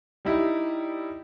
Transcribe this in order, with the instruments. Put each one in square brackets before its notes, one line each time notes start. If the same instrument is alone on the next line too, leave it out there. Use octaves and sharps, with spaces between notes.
[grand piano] G3 D#4 E4 G4